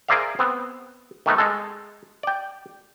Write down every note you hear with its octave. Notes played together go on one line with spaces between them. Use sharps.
G#4 A#4 C5 D5 E5 F5
B3 C4
D#3 A3 B3 D#4
G#3 A4
D5 G5